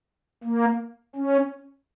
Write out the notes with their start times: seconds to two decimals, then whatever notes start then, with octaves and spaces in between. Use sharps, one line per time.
0.44 A#3
1.16 C#4